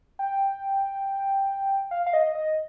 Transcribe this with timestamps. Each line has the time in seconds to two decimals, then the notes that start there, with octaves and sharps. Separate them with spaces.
0.19 G5
1.91 F5
2.07 F5
2.13 D#5
2.35 D#5